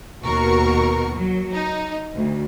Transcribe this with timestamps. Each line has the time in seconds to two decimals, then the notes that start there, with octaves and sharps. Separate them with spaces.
0.24 D#2 B2 F#4 A#4 C#6
1.14 F#3
1.54 D#4
2.14 D2